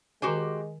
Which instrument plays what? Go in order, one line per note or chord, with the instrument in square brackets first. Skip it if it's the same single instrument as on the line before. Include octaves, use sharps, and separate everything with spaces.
[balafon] D#3 G#5 [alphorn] G#3 [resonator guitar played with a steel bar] F#4 G4 C5